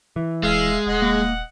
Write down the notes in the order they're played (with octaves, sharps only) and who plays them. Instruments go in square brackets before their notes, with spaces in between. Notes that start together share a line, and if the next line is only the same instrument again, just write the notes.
[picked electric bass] E3
[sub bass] D#1 [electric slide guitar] G#3 [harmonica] E5 F5
[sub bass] D#1 [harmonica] D#5 F#5
[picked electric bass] A#3